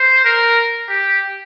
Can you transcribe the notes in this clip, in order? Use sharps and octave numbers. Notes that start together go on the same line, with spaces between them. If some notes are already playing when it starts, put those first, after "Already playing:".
Already playing: C5
A#4
G4